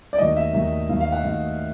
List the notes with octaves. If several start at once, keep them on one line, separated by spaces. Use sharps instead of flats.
D5
D#2 D#3 F#3 A3 D#5
E5
D#2 D#3 F#3 A3 E5
D#2 D#3 F#3 A3 F5
F5
F#5
D#2 D#3 F#3 A3 F5